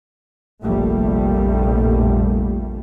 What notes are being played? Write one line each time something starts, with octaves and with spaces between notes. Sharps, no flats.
F1 A#1 G3 A3